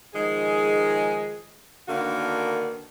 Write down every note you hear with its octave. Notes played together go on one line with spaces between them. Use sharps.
D#3 F3 G#3 G#4
D3 D#3 A#3 B3 D4 F#4